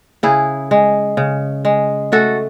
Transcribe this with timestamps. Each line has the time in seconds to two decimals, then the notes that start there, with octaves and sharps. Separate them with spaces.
0.23 C#3 E4 G#4
0.71 G#3
1.17 C#3
1.65 G#3
2.12 A3 F#4 A4